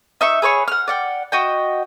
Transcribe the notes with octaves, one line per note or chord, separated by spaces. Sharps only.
D#4 E5 C#6
G#4 B4 C#5 C#6
F#5 F6
D5 F#5 G5
F#4 D#5 G5